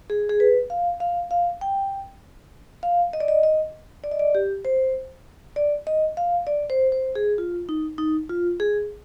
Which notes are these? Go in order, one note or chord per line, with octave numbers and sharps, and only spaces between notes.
G#4
G#4
B4
F5
F5
F5
G5
F5
D#5
D5
D#5
D#5
D5
D#5
D5
G4
C5
D5
D#5
F5
D5
C5
C5
G#4
F4
D#4
D#4
F4
G#4